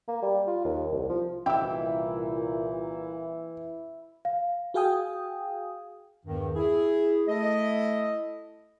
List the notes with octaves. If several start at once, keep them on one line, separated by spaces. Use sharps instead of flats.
A#3
G3
F4
D#2
C2
F3
C2 A#2 E3 E4 G5 D6 E6
F5
F#4 G#4 F5 G5 G#5 D#6
E2 G2 D#3
E4 G#4
A3 E4 A4 D#5